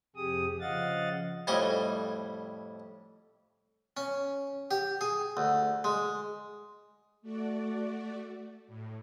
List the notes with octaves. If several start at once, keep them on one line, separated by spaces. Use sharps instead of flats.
F2 C3 G4 G#4 D#6
C#3 F3 D#5 F5 F#5 A6
F2 A2 G3 C5 D#5 G#5
C#4
G4
G#4
D2
G#3
A3 F#4 D5
A2